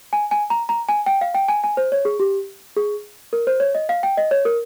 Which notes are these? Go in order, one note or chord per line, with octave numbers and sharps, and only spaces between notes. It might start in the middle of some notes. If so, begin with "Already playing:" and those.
G#5
G#5
A#5
A#5
G#5
G5
F5
G5
G#5
G#5
C5
C#5
G#4
G4
G#4
A#4
C5
C#5
D#5
F5
G5
D#5
C#5
A#4